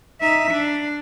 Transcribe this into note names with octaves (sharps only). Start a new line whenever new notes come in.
D#4 E5
D4